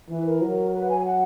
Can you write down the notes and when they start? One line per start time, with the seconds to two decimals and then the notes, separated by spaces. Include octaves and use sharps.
0.10 E3 B4
0.26 A#4
0.41 F#3
0.72 B4
0.81 F#5
0.89 G#5
1.05 F#5